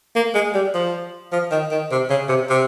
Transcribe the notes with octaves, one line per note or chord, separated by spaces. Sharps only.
A#3
G#3
G3
F3
F3
D#3
D#3
C3
C#3
C3
C3